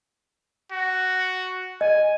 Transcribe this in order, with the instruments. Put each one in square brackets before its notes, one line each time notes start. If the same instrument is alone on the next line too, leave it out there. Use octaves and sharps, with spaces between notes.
[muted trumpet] F#4
[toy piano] D#5 [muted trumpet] G#5